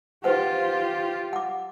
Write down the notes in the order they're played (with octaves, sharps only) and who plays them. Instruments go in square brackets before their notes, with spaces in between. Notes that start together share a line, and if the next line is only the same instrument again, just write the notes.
[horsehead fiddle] F4 G4 [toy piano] B4 C5 F#5
[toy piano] F#5 D6